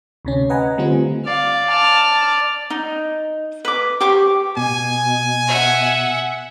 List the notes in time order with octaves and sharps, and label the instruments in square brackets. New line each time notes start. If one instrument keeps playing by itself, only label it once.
[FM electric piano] D2 C3 C#4
B4 D#5 F#5 G#5 A#5
D3 G3 A3 C4 F4
[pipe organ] D5 [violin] F5
[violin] A5 F6
[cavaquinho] D#4
B4 D6
G4 C5 C#6 D6
[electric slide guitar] B2 [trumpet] G#5
[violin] E5 F#5